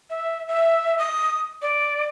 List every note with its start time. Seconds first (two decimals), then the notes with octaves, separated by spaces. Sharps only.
0.10 E5
0.48 E5
0.99 D#6
1.62 D5